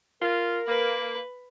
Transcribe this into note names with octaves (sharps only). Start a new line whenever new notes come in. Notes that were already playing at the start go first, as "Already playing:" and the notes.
F4 A#4
A#3 B4